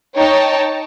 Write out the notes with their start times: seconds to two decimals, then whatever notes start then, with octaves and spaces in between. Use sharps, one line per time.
0.17 D#4 C#5 G5 A5